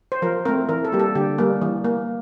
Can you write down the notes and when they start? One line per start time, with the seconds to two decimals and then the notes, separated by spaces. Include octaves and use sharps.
0.12 C5
0.22 F3 A#4
0.45 A3 C4 A#4
0.69 E3 A#4
0.85 A4
0.92 G3 A#3 G4
1.00 A4
1.15 D3 G4
1.38 G3 A#3
1.62 E3
1.85 A#3